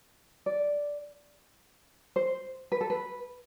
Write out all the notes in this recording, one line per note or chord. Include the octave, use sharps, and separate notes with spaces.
D5
C5
B4
A4
B4